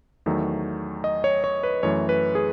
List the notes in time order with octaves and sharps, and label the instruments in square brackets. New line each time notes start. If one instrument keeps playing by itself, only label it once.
[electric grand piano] E2 D#3 F#3 A3
D#5
C#5
C#5
B4
F#2 E3 A3 C#5
B4
G#4